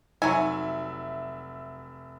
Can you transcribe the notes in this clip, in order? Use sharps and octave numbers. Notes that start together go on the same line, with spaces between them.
F1 F#3 D#4 E5 G#5